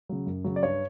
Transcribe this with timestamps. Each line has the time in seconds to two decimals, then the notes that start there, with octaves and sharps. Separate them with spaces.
0.09 C#3 F#3
0.26 F#2
0.44 C#3 F#3
0.56 D5
0.62 G2 C#5